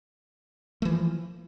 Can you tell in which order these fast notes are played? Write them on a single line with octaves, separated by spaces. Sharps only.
A3 E3 F3